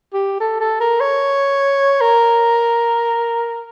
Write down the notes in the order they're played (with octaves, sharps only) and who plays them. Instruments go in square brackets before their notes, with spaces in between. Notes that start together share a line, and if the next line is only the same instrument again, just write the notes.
[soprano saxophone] G4
A4
A4
A#4
C#5
A#4